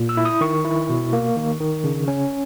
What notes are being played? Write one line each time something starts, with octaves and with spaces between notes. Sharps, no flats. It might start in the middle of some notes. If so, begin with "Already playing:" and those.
Already playing: A#2
E6
E4
D#6
D#3 C#6
E4
B2
A#3
D#3
D#3
C#3
C#4